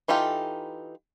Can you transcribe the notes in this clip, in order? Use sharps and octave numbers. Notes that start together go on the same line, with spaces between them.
E3 D#4 F4 G4 A4